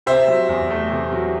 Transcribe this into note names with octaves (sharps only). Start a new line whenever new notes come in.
C3 C5 E5
F#3
E2
A3
C3
F#3